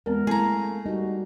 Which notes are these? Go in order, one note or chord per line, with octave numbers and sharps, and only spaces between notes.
E2 G#3 B3 C4 A#4
A3 A#3 E4 G#4 A#5
G3 D#4 F#4